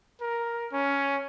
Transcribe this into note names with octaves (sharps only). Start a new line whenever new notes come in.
A#4
C#4